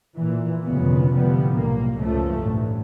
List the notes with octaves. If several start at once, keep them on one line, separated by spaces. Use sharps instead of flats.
A#2 E3
F1 D2 A#2 C#3 G#3 B3
A2 D3 F3 G3 B3
B1 A#3
C#2 F#2 F3 A3
A1 G2 B2